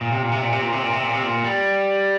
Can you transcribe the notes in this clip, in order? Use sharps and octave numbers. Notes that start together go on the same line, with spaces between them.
A#2
C3
A#2
C3
A#2
C3
A#2
C3
A#2
C3
A#2
C3
A#2
G3